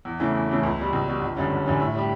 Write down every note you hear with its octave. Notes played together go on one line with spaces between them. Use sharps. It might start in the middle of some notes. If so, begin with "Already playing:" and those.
E2
C#3 E3 A3
E2
C#3 E3 A3
C#2
B2 G3
C#2
B2 G3
G1
F#2 D3 G3 C#4
G1
F#2 D3 G3 C#4
A2
G3 D4 G4